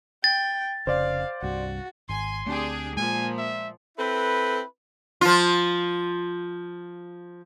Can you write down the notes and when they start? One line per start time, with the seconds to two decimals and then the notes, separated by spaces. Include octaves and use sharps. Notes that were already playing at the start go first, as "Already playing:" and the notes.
0.24 G5 A6
0.87 F1 C#3 C5 D5 F5
1.42 C2 G2 F#4
2.09 G#1 G#5 C6
2.46 D2 A3 C4 D4 G4 G#4
2.97 A#2 F3 G#3 G#5
3.38 E5
3.97 C4 E4 A4 B4
5.21 F3 F4